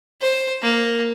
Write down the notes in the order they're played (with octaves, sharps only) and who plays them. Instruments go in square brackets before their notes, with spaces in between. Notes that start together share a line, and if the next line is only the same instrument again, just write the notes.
[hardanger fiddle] C5
A#3